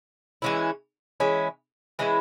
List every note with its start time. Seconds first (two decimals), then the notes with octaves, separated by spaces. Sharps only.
0.42 E3 G#3 C#4 E4
1.20 E3 G#3 C#4 E4
1.99 E3 G#3 C#4 E4